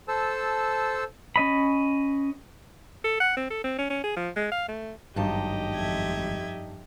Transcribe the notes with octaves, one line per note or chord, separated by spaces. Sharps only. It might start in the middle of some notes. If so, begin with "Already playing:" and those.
A4 C5 A5 E6
C#4 D#5 B5
A4
F#5
C4
A4
C4
C#4
C#4
G#4
F3
G#3
F5
A3
G#1 G2 F#3 G3 D#4 G4 D#5 A5
F2 E5 G#6